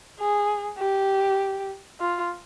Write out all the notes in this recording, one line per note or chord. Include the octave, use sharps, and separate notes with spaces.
G#4
G4
F4